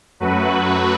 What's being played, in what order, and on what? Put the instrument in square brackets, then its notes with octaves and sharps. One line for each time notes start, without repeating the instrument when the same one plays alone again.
[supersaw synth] F#2 F#3 A3 F#4 B4